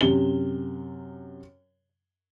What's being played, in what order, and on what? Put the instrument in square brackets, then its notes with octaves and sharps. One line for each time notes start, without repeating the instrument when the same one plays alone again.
[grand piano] F#2 C3 G7